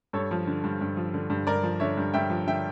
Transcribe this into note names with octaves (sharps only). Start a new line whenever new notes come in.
G2 A4 C#5
F3
D3
G2
G2
F3
D3
G2
G2 A#4 D5
F3
D3 C#5 E5
G2
G2 E5 G5
F3
D3 E5 G5